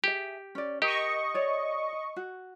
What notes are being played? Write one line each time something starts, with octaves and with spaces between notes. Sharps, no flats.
G4 G#4 E5
C#4 D5
G4 A#4 D#5 C#6
C#5 D5
F#4